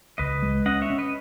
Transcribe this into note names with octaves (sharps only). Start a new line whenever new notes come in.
C#2 B4 D#5
G#3
C#4 D#5 F#5
C#5 E5
C#4
B4 D#5